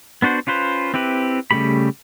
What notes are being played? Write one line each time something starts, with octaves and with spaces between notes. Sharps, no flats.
B3 D4 F#4 C5
C#4 F4 B4 C5
C4 E4 G4 B4
C#3 G3 A3 G4 B5